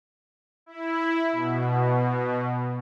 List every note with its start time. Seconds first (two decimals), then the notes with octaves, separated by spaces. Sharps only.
0.66 E4
1.32 B2